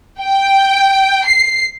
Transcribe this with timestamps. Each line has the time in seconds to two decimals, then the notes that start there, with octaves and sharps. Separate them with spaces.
0.20 G5
1.25 C7